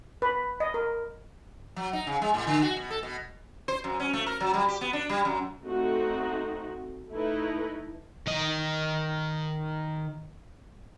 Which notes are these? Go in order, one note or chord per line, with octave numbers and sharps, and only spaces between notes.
B4
D#5
A#4
F#3
D#4
C#3
G#3
A2
D3
F#4
B2
A4
B2
C5
F#2
C#4
A3
A#4
F#3
G3
G4
B3
D4
G3
F#2
A3 C4 D#4 F#4
A3 D#4 E4 A4 B4
D#3 D#5